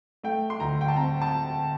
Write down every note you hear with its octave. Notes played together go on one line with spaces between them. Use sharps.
A3 G5
C6
D2 A#5
G5
A5
C4 A#5
A5